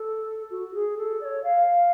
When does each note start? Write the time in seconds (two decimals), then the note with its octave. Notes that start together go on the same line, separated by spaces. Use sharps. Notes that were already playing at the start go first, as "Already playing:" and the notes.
Already playing: A4
0.50 F#4
0.74 G#4
0.97 A4
1.21 D5
1.25 C#5
1.43 F5